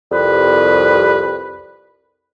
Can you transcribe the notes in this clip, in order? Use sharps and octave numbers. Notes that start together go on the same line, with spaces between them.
C2 F2 G3 B4